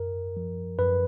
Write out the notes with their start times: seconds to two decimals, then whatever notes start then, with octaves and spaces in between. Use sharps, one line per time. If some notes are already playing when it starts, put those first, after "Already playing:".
Already playing: F#2 A#4
0.37 F3
0.78 F#2 B4